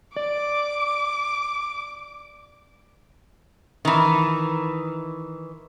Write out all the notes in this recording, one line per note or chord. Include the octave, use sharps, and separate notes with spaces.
D5 D6
D#3 E3